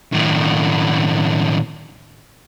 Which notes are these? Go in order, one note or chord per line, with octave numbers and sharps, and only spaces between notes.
D#2 A2